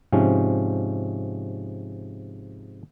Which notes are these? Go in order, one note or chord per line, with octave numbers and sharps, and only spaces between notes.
G#2 C3 F3 C#4